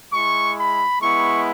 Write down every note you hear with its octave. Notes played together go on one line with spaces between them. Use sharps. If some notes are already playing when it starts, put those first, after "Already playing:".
G#3 E4 C#6
B5
G#3 B3 E4 C#6